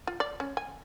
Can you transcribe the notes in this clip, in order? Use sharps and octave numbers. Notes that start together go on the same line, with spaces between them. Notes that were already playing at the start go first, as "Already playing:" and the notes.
F4
D5
C#4
G#5